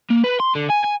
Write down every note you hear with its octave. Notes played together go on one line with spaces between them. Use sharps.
A#3
B4
C6
D3
G#5
G#5